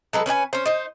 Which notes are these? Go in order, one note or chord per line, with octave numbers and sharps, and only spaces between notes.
F#3 G#3 A4 B4
C#4 B4 D5 G#5
C#4 C5
D#4 C5